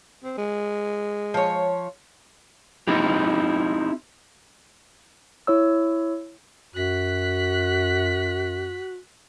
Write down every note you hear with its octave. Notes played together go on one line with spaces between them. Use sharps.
C4
G#3
F3 C#5
C4 D#4 E4 G4
E4 C#5 E6
F#2 F#4 F#6 B6